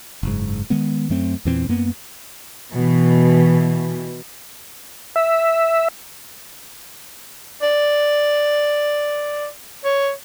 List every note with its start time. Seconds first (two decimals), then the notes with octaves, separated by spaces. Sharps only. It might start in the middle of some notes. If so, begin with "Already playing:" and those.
0.23 F#1 G#2
0.70 D#3 G#3 B3
1.10 F#2 F#3 A3 C4
1.45 E2 A#2 E3 C4
1.69 F#2 A#3 B3
2.73 B2 E3
5.16 E5
7.62 D5
9.84 C#5